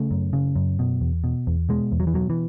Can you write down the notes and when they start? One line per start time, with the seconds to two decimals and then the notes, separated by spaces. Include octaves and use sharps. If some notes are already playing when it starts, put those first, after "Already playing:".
Already playing: C#3 A3
0.11 F#2
0.33 C#3
0.56 F#2
0.79 B2
1.01 E2
1.24 B2
1.47 E2
1.69 B2 G#3
1.92 E2
2.00 F#3
2.07 E3
2.14 B2 F#3
2.30 E3